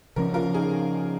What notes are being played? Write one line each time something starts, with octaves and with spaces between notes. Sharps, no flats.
C#3 F3 C#4 A#4
F4 A#4
D#4 G#4